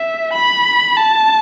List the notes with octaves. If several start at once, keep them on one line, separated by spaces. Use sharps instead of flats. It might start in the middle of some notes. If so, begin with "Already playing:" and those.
Already playing: E5
B5
A5